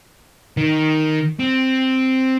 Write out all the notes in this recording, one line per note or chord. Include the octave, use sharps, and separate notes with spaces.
D#3
C4